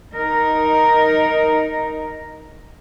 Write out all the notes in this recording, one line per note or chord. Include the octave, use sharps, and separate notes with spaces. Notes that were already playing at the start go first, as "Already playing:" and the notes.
D#4 A#4